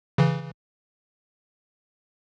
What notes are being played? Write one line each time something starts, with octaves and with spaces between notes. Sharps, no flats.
C#3 E3